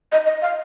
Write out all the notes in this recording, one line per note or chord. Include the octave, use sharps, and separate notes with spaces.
D#5
D#5
F5